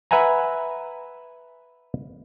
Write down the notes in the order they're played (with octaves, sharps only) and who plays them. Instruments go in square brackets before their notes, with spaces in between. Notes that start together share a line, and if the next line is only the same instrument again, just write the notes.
[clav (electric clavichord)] B4 E5 F#5 G#5 A#5